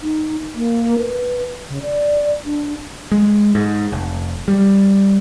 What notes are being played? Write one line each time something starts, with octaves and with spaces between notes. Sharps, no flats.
D#4
A#3
B4
C#3
D5
D4
G#3
G#2
F1
G3